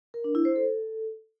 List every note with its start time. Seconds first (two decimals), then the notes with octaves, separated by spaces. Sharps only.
0.14 A#4
0.24 D4
0.35 E4
0.45 C5
0.56 A4